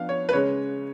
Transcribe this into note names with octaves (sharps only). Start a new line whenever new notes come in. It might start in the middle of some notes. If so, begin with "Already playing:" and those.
Already playing: F3 B3 D4 F5
C#5
B4
C#3 G#3 C#4 C#5